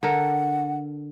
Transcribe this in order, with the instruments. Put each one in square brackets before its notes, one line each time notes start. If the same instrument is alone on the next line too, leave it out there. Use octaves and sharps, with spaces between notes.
[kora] D3 A4 A#4 [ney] F#5